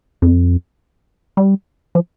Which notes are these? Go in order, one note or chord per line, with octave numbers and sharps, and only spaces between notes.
F2
G3
F3